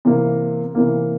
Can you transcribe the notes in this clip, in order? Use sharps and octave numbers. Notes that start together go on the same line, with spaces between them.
C3 E3 A#3
C3 E3 A#3